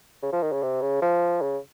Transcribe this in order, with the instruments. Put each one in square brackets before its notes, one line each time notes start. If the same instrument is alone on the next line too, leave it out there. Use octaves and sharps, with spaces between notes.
[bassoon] C#3
F3
D#3
C#3
C3
C#3
F3
C#3